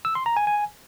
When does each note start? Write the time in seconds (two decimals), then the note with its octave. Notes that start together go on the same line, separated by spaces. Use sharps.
0.05 E6
0.15 C6
0.26 A#5
0.37 G#5
0.47 G#5